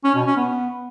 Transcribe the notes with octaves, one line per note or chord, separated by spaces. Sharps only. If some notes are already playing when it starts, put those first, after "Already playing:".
C#4
B2
C#4
B3